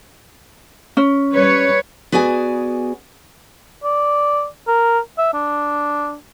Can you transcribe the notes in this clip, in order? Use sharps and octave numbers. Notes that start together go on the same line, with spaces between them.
C#4
G3 B4 C#5
B3 F#4 G#4 D5 G#5
D5
A#4
E5
D4